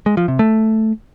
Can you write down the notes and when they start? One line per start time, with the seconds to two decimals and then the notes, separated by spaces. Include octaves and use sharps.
0.06 G#3
0.17 F3
0.28 C3
0.39 A3